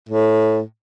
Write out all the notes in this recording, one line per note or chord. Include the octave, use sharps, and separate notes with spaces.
A2